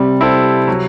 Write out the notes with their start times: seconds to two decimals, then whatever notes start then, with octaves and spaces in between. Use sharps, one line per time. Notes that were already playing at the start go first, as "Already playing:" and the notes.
Already playing: C3 G3
0.21 C4 E4 A4
0.68 F#3